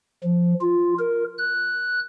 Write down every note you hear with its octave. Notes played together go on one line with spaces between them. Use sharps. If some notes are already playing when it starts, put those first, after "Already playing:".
F3
F4
A#4
F#6